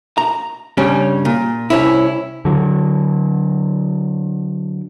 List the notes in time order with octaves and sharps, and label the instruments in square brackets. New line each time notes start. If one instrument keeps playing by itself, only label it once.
[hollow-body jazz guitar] A#5
G2 C#3 G3 C#4
A#2
C2 C#4 E4
[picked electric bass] D3 F#3